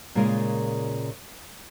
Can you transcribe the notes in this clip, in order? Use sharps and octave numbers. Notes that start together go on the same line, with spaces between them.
A#2 C#3 G#3 F4 A#4